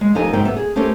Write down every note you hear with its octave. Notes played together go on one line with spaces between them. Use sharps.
G#3
F2 D#3 G4 A4 D#5 G#5
G#2 C3 D#3 F#3 C4 G5
G3 B3 E5
G#4
A3 C4 C#4 G4 A4 A#4